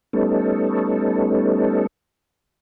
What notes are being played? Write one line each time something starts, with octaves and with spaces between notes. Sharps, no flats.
G3 A3 B3 C#4 D#4 A4